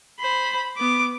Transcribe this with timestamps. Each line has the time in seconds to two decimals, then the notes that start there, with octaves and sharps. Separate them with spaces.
0.20 C5 B5
0.77 B3 D6